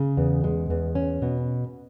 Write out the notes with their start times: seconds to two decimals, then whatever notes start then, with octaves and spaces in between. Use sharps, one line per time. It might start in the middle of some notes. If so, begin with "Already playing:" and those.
Already playing: C#3
0.17 E2
0.44 G#3
0.70 E2
0.95 C#4
1.22 B2